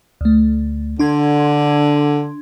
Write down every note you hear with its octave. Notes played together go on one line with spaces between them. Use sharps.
D2 A3
D3 D4 C6 G#6